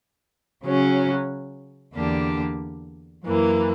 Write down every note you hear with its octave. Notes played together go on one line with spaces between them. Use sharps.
C#3 F#3 C#4
E2 D3 A#3 D4 G4
F#2 E3 A#3